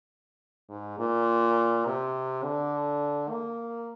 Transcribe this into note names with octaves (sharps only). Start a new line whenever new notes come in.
G#2
A#2
C3
D3
A#3